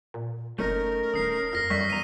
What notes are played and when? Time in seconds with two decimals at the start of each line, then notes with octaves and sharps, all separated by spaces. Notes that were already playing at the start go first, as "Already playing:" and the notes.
0.14 A#2
0.59 F#1 A3 C#4 D#4 A#4
1.14 D#1 D#6 C7
1.53 F2 F6 A#6 C7
1.70 F#2 F#3 G3 A3 C#6 E6 B6
1.90 E2 G2 A#5 D#7